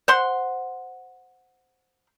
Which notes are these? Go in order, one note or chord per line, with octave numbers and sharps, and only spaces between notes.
C5 F#5 C6